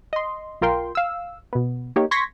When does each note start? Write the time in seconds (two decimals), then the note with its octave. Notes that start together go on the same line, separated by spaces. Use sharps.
0.13 D#5 C6
0.61 B1 F4 A#4 G5 C6
0.95 F5 E6
1.53 B2 B3
1.96 A#3 D#4 G4 C#5
2.11 C6 C#6 G#6 A#6 B6